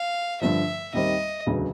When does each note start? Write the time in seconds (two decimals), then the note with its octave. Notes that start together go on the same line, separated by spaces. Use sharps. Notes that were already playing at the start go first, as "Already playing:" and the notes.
Already playing: F5
0.41 G2 D3 F3 E5
0.93 D#2 D#3 G3 C4 D#5
1.46 E1 D2 C#3 F#3 B3